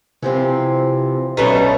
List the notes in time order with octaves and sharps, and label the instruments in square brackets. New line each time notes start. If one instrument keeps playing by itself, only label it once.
[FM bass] C3 [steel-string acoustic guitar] E3 F3 C4
[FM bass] B1 [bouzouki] B2 A3 D#4 [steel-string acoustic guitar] D3 [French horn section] C#4 B4